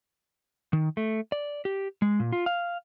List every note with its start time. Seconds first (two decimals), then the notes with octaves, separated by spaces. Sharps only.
0.73 D#3
0.97 A3
1.32 D5
1.65 G4
2.02 G#3
2.20 A#2
2.33 F4
2.46 F5